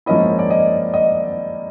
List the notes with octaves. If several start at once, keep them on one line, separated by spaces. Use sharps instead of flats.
G#2 F3 A#3 C#4 E4 D#5
D5
D#5
D#5